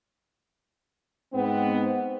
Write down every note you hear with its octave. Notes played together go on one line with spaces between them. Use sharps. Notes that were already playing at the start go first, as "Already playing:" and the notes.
G#2 B3 C4